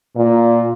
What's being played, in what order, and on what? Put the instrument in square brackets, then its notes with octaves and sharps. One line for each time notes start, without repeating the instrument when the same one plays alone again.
[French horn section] A#2